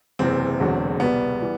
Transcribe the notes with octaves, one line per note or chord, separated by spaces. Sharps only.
F#1 E2 C3 E3 C4
E1 E2 D3 F#3
C2 B2 G3 B3
E3 G3